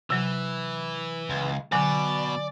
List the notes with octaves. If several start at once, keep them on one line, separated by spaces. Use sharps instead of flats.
C3 E3 F#3
C#2
B2 D3 F#3 D5 G#5